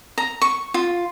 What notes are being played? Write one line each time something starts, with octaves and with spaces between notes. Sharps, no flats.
A#5
C#6
F4